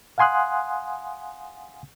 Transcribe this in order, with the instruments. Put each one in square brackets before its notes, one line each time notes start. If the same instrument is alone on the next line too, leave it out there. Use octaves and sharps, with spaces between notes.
[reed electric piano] F5 F#5 G#5 C6 D#6 F#6